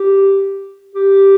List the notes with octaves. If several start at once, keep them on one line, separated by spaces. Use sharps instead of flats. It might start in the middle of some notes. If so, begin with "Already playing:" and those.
Already playing: G4
G4